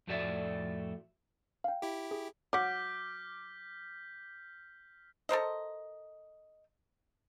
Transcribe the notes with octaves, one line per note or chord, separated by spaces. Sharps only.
F2 A2 A3 F#4 D5 E5
F5 G5
E4 G4
G#4
F#3 F#5 D6 F6 G6 B6
A4 A#4 C5 D#5